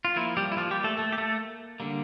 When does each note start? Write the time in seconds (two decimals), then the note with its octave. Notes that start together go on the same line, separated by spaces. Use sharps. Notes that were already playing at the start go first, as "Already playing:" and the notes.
0.05 F4
0.16 F3 A#3 E4
0.37 G3 G4
0.52 E4
0.57 F3 F4
0.71 G3 G4
0.84 A3 A4
0.97 A3 A4
1.12 G4
1.18 A3 A4
1.80 D3 G3 A#3